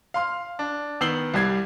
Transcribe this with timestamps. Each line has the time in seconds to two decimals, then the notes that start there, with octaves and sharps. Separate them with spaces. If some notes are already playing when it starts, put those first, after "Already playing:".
0.14 F5 C6 F6
0.59 D4
1.01 D#3 B3 E6 C7 F#7 G7
1.34 C2 G3 G#6 C7